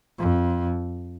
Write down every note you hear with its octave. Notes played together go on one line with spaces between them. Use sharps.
F2